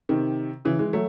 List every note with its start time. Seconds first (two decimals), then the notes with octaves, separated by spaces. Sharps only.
0.09 C3 D#3
0.65 C#3 E3
0.79 E3 G#3
0.93 F#3 A3